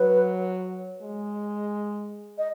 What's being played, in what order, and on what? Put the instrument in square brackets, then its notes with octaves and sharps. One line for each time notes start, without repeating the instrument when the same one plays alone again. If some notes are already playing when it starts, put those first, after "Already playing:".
Already playing: [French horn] F#3 [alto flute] B4
[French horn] G#3
[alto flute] D#5